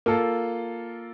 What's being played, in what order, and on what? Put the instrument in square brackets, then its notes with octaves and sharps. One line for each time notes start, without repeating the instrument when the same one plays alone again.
[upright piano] A#3 F4 A4